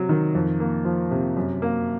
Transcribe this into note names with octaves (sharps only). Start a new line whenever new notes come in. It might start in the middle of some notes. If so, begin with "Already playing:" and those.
Already playing: C3 F#3
D#3
F2
A#3
F3
C3
F#2
A#3